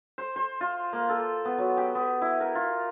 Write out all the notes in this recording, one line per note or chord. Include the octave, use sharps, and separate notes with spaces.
C5
C5
F4
A#3
A4
B3
F#3
G4
B3
E4
A#4
F4